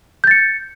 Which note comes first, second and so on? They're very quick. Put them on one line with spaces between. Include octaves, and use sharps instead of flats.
G6 A6 C#7